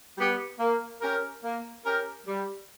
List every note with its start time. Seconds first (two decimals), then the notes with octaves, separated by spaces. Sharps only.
0.18 G3 B3 G4
0.60 A#3
1.02 C#4 G4 A#4
1.43 A#3
1.85 C#4 G4 A#4
2.27 G3